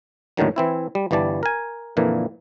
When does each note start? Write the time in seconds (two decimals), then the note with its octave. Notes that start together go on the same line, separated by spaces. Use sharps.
0.37 D#2 A2 D3 D#3 F#3
0.56 E3 C4 E4
0.95 G3
1.11 G1 E3 G3 D5 A5
1.43 A#4 G#5
1.97 F2 A#2 D3 E3 A#3